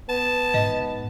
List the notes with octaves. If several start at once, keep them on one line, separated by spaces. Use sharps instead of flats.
B3 A5
G#2 D#5